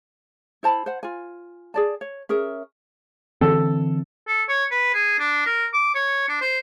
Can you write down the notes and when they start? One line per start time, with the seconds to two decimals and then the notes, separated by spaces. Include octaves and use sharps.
0.63 E4 C5 A5 B5
0.86 C5 F#5
1.03 F4 G#5
1.74 G#4 D5 A5
2.01 C#5
2.29 C#4 G#4 A#4 E5
3.41 D3 E3 C4 A4
4.28 A4
4.49 C#5
4.71 B4
4.94 G#4
5.20 D4
5.46 A#4
5.74 D6
5.95 C#5
6.29 D4
6.41 C5